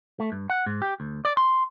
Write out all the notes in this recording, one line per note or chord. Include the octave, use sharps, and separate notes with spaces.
A3
G2
F#5
G#2
G4
D2
D5
C6